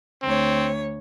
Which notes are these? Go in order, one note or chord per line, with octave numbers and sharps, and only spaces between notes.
D2 C4 C#5